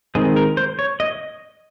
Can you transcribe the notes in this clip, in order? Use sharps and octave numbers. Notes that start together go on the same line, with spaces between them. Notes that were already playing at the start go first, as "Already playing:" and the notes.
D#3 G#3 C4 G#4
A#4
C5
C#5
D#5